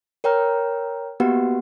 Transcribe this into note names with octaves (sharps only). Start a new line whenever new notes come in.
A#4 C#5 G5 A#5 F6
A#3 B3 F#4 G4 B4 F#5